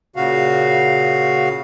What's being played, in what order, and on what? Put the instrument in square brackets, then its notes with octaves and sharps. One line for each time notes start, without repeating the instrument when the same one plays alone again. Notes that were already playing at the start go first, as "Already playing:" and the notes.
[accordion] A#2 C#3 F#4 F5